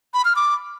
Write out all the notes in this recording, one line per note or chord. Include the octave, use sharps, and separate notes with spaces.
B5
F6
D6